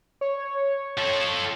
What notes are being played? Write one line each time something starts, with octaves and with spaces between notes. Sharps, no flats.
C#5
F3 A4